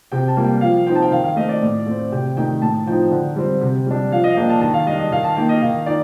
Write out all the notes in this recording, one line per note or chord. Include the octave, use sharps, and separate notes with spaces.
C3 G5
A5
G3 A#3
G5
F3 F5
C4 D#4 G5
A5
G5
D#3 F5
F5
A3 C4 D#5
D5
A2
A3 C4
C3 G5
D#3 A3 D#4 G5
A2 A5
F3 C4 D#4 G5
D3
G3 C4
C3
G3 D4
F3 F5
D#5
F5
A#3 D4 G5
A5
D#3 A5
F5
G3 D4 D#5
D#5
D#3 F5
A5
A#3 D#4 G5
D#5
D#3 F5
D#4 D5